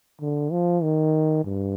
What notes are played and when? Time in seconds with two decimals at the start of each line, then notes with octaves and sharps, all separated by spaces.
0.21 D3
0.52 F3
0.83 D#3
1.44 G2